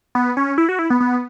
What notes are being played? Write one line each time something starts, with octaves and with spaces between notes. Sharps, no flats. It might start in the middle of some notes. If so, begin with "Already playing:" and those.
B3
C#4
E4
F#4
E4
B3
B3